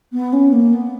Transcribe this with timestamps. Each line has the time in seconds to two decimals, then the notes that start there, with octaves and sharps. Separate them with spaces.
0.13 B3
0.33 C#4
0.52 A#3
0.73 B3